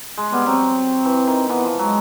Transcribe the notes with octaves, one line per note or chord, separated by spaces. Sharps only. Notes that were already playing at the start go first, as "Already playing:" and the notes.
G#3
G3 B3
F#3 C4
E3
D#3
E3 B3
F3
F#3 G#3